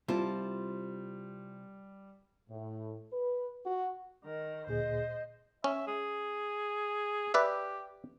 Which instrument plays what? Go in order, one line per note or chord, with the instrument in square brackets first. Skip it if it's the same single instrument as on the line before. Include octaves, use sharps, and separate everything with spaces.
[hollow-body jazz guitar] C3 E4 A#4 [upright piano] G3 [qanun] F4 [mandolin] C5 A5
[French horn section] A2
B4
F#4
[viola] D#3 A#4
[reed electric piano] D2 A#2 G#4 [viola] C5 D#5
[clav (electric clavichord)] C#4 [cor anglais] E5
[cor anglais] G#4
[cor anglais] G4 [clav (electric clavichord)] B4 D5 E5